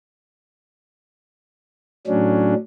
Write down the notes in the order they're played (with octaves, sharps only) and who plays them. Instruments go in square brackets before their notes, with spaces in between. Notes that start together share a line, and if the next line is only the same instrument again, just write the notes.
[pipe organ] A2 F#3 C#4 D4